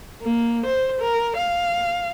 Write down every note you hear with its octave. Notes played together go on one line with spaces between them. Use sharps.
A#3
C5
A#4
F5